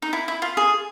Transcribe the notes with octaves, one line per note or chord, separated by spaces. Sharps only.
D#4
E4
E4
F4
G#4